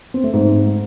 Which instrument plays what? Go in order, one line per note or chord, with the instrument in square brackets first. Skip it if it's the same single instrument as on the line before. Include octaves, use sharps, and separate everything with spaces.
[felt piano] C4
A3
G#2